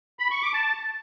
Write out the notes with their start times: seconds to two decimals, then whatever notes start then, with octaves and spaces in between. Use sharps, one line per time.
0.19 B5
0.31 C#6
0.42 D6
0.54 A5